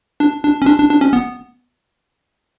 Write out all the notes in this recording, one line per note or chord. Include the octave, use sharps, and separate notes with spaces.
D4
D4
C#4
D4
D4
D4
C#4
B3